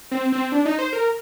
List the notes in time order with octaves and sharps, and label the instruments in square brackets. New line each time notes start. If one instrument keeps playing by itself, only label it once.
[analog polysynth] C4
C4
D4
D#4
C5
A#4